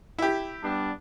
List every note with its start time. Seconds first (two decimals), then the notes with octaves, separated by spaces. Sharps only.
0.18 E4 G4
0.64 G3 B3 D4